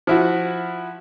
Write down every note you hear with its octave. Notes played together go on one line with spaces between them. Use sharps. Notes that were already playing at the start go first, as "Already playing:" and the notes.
F3 E4 F#4